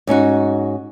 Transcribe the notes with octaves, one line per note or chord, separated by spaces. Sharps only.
G#2 C#4 D#4 F#4